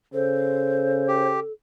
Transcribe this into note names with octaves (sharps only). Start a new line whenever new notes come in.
C#3 A4 C5
G4